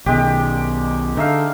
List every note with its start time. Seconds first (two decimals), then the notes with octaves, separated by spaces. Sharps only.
0.06 B1 B2 D#3 G#3 G4
1.17 D3 D#4 E5 F5